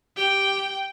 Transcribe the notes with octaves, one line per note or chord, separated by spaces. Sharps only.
G4 G5